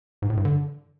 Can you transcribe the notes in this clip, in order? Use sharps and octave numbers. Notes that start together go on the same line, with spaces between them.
G#2
A2
G2
D3